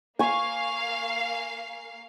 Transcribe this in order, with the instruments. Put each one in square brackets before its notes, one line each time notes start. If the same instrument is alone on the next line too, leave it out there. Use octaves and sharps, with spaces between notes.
[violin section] A#3 F5 C7 [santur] G#5 C#6